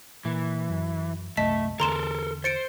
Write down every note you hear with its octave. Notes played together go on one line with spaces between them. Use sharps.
A#2 E3
F#2
C2 F#2 A3 D#5 A5 B6
E2 D3 A4 A#4 A#5 C6 E7
C5 A6 C#7 D7